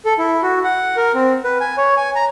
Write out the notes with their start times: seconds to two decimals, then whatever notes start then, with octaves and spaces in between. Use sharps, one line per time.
0.05 A4
0.18 E4
0.43 F#4
0.64 F#5
0.97 A#4
1.15 C4
1.44 B4
1.61 G#5
1.78 C#5
1.97 G#5
2.16 A#5